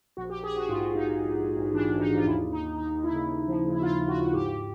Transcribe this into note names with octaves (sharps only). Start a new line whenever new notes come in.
A#1 F#4
G4
A#1
G#4
A#1
F#4
G#2 F4
G#2
D#4
G#2
A#1
A#1
A#1
E3 D4
A#1
D#4
G#2
F4
D#2 E4
D#2
D#4
D#2
D#2 D#4
D#2
E4
C#3
D#2
F3
C#3
E4
D#2 F4
D#2
F#4
D#2
G#2 G4